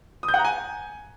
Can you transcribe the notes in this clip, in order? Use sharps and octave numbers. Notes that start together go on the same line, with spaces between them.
D#6
G6
F#5
A#5
G#5